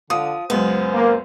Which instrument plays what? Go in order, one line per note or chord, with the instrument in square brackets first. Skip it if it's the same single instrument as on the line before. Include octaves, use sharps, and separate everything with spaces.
[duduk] D3 [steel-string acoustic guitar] F3 [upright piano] D#6
[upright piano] C#2 F#2 [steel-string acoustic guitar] B3 [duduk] C5
[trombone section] A#3